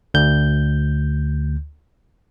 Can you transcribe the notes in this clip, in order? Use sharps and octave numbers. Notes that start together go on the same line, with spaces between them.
D2 G6